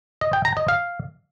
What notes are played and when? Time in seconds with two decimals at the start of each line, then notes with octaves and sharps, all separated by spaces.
0.21 D#5
0.33 G5
0.45 A#5
0.57 D#5
0.68 F5